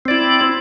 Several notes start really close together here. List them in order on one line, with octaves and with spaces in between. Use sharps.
C4 D5 E4